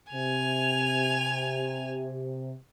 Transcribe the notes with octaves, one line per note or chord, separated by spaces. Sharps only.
C3 G#5 F7